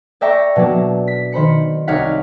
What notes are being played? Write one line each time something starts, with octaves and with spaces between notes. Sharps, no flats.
D5 E5 G5 A#5 C#6
B2 F#3 A#3 D4
B6
D#3 C5 B5 C#7
C2 D#4 C#5 F5 F#5 B6